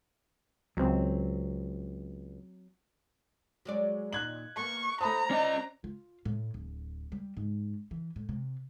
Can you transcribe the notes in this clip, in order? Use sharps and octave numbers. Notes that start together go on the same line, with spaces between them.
C#2 F#3 C4
F#3 G#3 D5
D#2 A#2 D#4 F#6 G#6 F#7
A#3 B3 C#6
A3 C5 A#5 B5 D#6
C#4 D5 D#5
F4
A2
D1
G3
G#2
E3
A2
C3